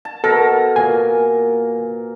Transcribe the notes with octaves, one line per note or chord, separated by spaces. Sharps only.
A5
B2 A4 A#4 A#5
A#2 G#5